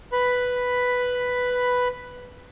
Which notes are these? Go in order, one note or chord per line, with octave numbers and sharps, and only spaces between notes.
B4 B5